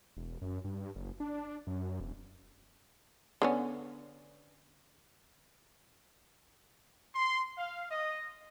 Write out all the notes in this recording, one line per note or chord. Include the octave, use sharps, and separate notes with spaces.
E1
F#2
G2
F#1
D4
F#2
E1
D3 B3 C#4
C6
F5
D#5